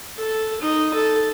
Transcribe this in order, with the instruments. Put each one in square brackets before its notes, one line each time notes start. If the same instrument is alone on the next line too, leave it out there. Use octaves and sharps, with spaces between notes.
[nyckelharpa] A4
D#4
A4